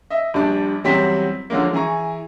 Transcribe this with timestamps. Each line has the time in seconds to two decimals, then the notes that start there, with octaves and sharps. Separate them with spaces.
0.10 D#5 E5
0.34 A#1 G3 D4
0.84 E2 F#3 G3 C4 C5 B6
1.50 D3 F3 F#3 G#3 A#3
1.73 E3 G#4 G#5 A#5 C#6